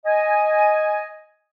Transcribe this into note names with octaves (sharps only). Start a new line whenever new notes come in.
D#5 G#5